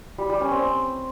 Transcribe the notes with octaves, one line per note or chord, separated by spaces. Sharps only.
G3
G3
C#4
C4